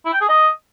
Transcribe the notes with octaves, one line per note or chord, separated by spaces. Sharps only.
E4
G5
G#4
D#5